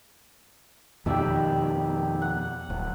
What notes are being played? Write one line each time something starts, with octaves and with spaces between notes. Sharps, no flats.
F2 B2 D#3 G4 D5 E5
F#5
D1